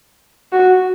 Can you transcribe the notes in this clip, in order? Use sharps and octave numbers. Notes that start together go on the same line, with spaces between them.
F#4